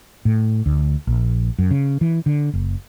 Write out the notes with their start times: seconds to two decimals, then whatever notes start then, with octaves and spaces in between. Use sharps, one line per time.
0.25 A2
0.66 D2
1.07 A#1
1.59 F#2
1.71 C#3
2.01 E3
2.26 D3
2.53 F#1